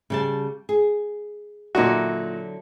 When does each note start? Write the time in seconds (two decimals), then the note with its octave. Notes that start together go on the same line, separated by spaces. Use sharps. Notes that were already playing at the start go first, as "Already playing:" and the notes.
0.10 C#3 G3 A5
0.69 G#4
1.75 A#2 D3 F#3 D#4 E4 F#4